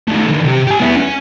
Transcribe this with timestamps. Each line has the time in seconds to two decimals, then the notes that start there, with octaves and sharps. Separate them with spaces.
0.08 D#3 A3
0.28 D3 E3
0.44 C3 G4
0.67 G4 G#5
0.81 B3 E4
0.97 C#4